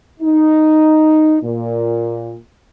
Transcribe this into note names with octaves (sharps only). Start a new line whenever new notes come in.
D#4
A#2